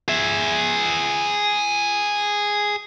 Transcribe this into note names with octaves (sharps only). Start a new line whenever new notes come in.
G#4 E5